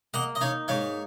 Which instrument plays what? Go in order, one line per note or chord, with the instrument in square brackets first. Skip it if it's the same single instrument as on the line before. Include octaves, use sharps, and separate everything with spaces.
[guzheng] A#3 [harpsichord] D#5 F#5
[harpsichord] D#5
[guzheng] D#4 [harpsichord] C#5 F5
[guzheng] G#2 [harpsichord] C#5 F5